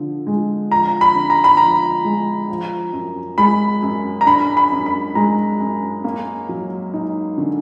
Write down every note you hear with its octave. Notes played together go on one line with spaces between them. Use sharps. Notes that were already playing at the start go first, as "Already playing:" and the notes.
Already playing: D3 F3
G#3
F3 A#5
B5
D3
A#5
B5
F3 A#5
G#3
F3
F#2
G#3 B5
F#2
A#5
D4 B5
B5
F#2
B5
G#3 A#5
F#2
A#3
F#3
D#4
D3